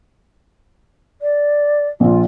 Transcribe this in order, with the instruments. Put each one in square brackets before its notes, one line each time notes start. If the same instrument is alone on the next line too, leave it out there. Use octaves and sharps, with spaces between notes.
[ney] D5
[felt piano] A#1 A#2 [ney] F4